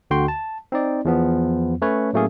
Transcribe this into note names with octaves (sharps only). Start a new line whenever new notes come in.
D2 D3 F#4 G5 C6
A5
C4 D#4 D5
E2 F3 B3
A3 C#4 B4 C#5
A2 F#3 A3 A#3 C#4 G#4